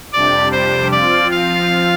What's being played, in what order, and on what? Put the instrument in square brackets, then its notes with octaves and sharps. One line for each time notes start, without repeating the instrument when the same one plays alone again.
[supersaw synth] F2 C3 G3 D4 G4 [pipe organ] D5
[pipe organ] C5
[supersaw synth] F3 C4 F4 [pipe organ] D5
[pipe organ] F5